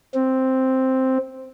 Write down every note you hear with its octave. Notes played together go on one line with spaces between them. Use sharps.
C4